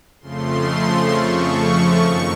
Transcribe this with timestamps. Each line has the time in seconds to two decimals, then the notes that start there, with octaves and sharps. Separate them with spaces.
0.21 F2 C#3 F3 A3 C6
1.12 C#6
2.03 F#2 D#3